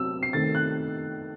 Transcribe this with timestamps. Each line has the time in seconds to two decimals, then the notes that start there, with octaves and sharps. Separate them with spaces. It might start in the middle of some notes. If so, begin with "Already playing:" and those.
Already playing: C3 F#3 C4 E6
0.23 C7
0.33 D#3 A3 C4 A6
0.55 F#6